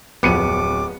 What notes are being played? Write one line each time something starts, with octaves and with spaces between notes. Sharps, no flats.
D1 F2 B3 D6 C#7 D#7